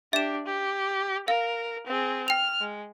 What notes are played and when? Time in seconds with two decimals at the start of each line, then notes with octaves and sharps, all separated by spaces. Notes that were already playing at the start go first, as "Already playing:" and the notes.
0.13 D4 G4 E5 E7
0.46 G4
1.28 A#4 F5
1.87 C4 G#4
2.28 G5 F6 F7
2.61 G#3